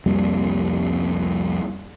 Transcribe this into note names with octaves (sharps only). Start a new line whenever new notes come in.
C2 F2 G3 A#3